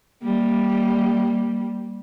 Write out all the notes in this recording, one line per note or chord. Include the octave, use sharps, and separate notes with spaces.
G3 A#3